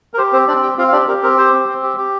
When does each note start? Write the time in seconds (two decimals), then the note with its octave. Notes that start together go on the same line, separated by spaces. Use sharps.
0.14 A#4
0.18 G4 C5
0.33 C4 C5
0.48 C4 D4 D5
0.63 G4 G5
0.78 C4 F4 F5
0.88 F5
0.92 D4 G4 D5
1.08 G4 A#4
1.23 C4 A#4
1.37 G4 C5
1.53 C4
1.68 C4
1.83 G4
1.97 G4